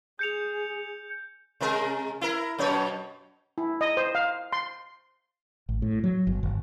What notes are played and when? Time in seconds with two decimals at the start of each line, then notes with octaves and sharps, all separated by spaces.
0.19 G#4 G6 C#7 F7
1.60 C3 G#3 A#4
2.21 E4 A#4
2.58 F#2 B2 C#5
3.58 E4
3.81 D#5
3.97 C5
4.15 F5
4.53 C6
5.69 A1
5.82 A2
6.04 F#3
6.27 G1
6.43 G1